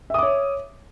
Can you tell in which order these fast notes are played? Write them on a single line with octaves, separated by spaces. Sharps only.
E5 D#6 D6 C#5